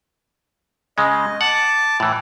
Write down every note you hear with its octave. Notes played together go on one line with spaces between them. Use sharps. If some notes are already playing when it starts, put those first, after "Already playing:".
C#3 G#3 D#5
F#5 A5 D6
A2 E3